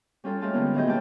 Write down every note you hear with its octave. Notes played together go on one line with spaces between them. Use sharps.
G3 C#4 F4 A4
G#3 A3 F4 G4 A5
D3 G3 A#3 B3 C#4
A2 D#3 F#3 G#4 D#5 G6
B2 G#3 A#3 G4 G5 A5